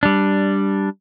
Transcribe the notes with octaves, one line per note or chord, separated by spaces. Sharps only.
G3 D4